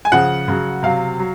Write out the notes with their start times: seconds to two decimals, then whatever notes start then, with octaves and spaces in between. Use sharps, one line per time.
0.05 G#5
0.12 C#3 F3 F#5
0.48 C#3 F#3
0.83 C3 F#3 F5
1.19 F#3